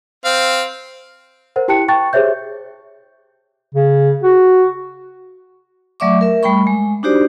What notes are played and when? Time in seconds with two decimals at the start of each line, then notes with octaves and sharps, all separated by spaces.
0.25 C4 F5
1.56 A#4 C5 F#5
1.68 E4 G4 G5 A5 F#6 C#7
1.88 G5 A5 C#6 F#6 A6
2.13 G4 G#4 C5 C#5 E5 G6
3.75 C#3
4.24 F#4
6.00 F#3 A3 D5 E5 C#6 D6
6.21 A#4 E5
6.43 G3 A3 G5 B5 C#6
6.67 G#3
7.03 D4 D#4 F#4 G4 C5 D5